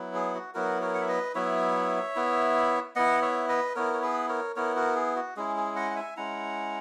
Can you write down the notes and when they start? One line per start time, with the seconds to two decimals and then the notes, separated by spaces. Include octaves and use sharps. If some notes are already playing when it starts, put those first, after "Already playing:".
Already playing: F#3 B3 E4
0.14 G#4
0.34 F#4
0.54 F#3 B3 E4 F#4 A#4
0.82 A#4 C#5
0.94 F#5
1.01 E5
1.08 B4 D#5
1.35 F#3 B3 E4 C#5 E5
2.16 B3 E4
2.96 B3 E4 D#5 F#5
3.22 C#5 E5
3.49 B4 D#5
3.75 B3 E4 A#4 C#5
3.93 C#5
4.02 G#4 B4
4.29 A#4 C#5
4.56 B3 E4 A#4 C#5
4.76 F#4 A#4
4.96 G#4
5.16 F#4
5.36 G#3 C#4 E4 G#4
5.57 G#4
5.76 D#5 F#5
5.91 F#5
5.96 E5 G#5
6.17 G#3 C#4 E4 F#5 A#5